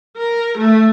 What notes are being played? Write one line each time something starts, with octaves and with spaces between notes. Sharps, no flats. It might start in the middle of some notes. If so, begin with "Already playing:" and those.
A#4
A3